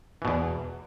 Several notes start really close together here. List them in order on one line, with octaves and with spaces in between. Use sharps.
E3 B2 E2